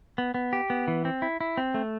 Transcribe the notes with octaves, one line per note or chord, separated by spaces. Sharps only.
B3
B3
G4
B3
E3
C4
E4
E4
C4
A3